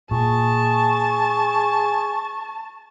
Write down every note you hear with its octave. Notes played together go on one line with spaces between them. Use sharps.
A#2 G#4 A5 C#6